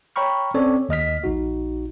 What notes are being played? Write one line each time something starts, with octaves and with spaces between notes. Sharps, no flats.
C#5 G5 A#5 B5 C#6 F6
C4 C#4 A4 C#5 D5
D#2 D#5 F6 B6
A#1 D#4 F#4